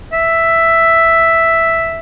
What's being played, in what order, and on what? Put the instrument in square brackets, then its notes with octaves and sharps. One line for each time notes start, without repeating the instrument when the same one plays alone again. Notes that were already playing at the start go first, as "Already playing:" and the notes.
[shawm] E5